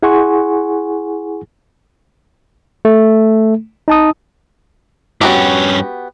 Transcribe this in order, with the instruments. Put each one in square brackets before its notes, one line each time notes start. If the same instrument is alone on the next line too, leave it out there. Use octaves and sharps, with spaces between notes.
[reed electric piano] E4 G#4 F#5 G#5 C6 C#6
[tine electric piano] A3
D#4 A5 D#6
[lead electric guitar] G2 C#4 [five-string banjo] B3 F#4 G4